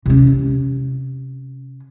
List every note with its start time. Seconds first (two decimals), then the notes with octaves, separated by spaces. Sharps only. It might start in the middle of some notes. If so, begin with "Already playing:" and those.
0.06 C3 C#4